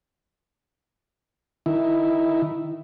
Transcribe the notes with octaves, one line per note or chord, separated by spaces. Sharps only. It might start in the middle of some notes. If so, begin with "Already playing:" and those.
D#3 E4